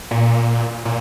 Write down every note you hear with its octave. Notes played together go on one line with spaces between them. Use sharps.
A#2
A#2